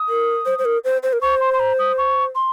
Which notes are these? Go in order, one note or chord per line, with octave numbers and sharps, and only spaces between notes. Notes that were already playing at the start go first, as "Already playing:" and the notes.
Already playing: D#6
A#4
C5
C5
A#4
C5
C5
A#4
C5 C#6
C6
C6
A#5
D#6
C#6
C6